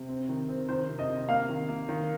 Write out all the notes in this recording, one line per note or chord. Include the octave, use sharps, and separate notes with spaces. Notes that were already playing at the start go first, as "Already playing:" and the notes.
Already playing: C3
C4
D#3
C4
D#3 C5
C3
D#5
C3
A#3 F5
D#3
A#3
D#3